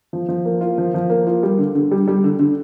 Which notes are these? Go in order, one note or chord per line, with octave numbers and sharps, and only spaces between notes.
F3
F3
A#3
F4
F3
F3
A#3
F4
G3
D3
D3
G3
G3
D3
D3